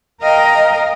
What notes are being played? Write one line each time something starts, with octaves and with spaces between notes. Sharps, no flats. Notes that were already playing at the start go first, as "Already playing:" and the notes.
A#4 D#5 F5 G5 A#5